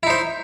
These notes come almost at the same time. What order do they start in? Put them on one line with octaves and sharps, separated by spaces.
E4 D#4 C5